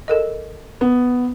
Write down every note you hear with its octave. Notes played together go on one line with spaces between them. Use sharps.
A4 A#4 D#5
B3